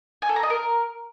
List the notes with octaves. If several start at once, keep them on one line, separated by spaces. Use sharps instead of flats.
G#5
A4
A#5
D#5
A#4